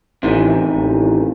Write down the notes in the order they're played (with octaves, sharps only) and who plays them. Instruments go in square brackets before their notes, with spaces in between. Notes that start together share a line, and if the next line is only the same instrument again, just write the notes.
[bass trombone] A1 [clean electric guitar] C3 D#3 E3
[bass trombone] A1